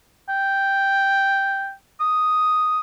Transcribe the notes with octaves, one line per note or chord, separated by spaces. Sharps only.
G5
D#6